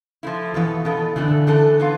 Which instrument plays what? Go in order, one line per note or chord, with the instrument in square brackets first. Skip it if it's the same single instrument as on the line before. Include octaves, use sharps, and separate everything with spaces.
[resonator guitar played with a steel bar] F3 A3 E4
[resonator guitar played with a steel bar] B2 B3 F4 A4 [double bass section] E3
[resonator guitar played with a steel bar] B2 B3 F4 A4
[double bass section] D3 [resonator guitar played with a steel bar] E3 A3 D4 A4
[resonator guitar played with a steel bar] E3 A3 D4 A4
E3 B3 F4